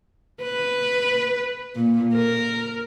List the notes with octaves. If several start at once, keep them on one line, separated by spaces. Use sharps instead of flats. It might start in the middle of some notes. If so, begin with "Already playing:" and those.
B4
A#2
A#4